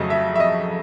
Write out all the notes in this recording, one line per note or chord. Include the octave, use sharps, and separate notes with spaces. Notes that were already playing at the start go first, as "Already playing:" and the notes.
Already playing: F2 C#3 F#3 A3 D#5
E5
E5
D#5